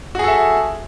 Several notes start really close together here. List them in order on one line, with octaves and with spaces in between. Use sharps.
F#4 G#4 A4 E5